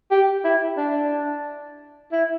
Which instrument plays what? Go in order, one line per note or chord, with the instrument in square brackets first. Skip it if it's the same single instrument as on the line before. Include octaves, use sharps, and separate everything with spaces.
[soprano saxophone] G4
E4
D4
E4